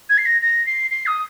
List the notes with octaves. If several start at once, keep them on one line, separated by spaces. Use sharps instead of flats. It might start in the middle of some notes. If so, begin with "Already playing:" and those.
G#6
C7
A#6
A#6
C7
C7
D#6